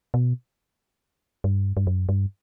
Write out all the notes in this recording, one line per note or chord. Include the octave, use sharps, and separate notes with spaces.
B2
G2
G2
F#2
G2